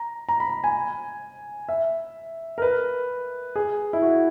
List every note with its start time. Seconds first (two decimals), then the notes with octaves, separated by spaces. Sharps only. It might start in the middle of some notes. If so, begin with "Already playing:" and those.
Already playing: A#5
0.29 A#5
0.40 B5
0.64 G#5
1.69 E5
2.58 A#4
2.62 B4
3.56 G#4
3.93 E4
4.02 F#4